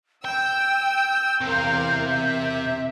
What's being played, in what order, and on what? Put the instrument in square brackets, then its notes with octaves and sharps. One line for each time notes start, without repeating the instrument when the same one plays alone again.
[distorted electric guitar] G5 [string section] E6 [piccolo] G6
[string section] E2 A#4 F5 [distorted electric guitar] C3
[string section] E5